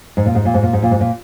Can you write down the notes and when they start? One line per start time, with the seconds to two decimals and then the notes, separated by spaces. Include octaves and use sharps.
0.17 G#2
0.26 A#2
0.35 G#2
0.45 A#2
0.54 G#2
0.63 A#2
0.73 G#2
0.83 A#2
0.91 G#2
1.01 A#2